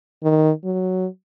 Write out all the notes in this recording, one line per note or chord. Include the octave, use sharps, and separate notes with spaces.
D#3
F#3